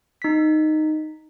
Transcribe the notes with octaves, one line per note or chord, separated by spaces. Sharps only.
D#4 B6